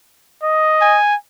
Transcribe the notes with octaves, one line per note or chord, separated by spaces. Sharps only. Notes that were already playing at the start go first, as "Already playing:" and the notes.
D#5
G#5